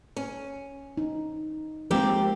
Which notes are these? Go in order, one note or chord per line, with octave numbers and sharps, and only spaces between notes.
C#4
D#4
F3 G#3 A#3 C4 G4